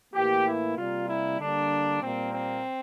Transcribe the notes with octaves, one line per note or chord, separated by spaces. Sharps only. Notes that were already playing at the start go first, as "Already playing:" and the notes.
A2 E3 A#3 G4
E4
C3 G3 A#3 F4
E4
D3 G3 A#3 D4
A#2 G3 A#3 C4
C4